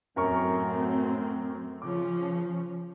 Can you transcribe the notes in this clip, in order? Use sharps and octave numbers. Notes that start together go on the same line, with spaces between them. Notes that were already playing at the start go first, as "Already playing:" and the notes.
F#2 A2 F#3 C4 A#4 C#6
C#3 F3 C#4 D6